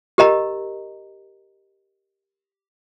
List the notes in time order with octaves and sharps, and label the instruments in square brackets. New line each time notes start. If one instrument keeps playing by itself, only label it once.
[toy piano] G4 A#4 D#5 A#5